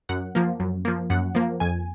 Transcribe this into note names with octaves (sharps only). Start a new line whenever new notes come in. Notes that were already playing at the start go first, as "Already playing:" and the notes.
F#2 F#5
F3 A#3
F#2
F3 A#3
F#2 F#5
F3 A#3
F2 G#5